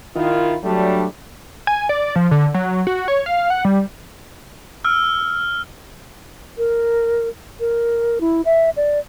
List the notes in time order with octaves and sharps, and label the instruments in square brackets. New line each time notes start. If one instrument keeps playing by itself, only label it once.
[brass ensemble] D#3 E4 F4
F#3 G3 A3 D4
[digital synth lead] G#5
D5
F3
D3
F#3
F#4
C#5
F5
F#5
G3
[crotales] E6 F6
[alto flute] A#4
A#4
E4
E5
D5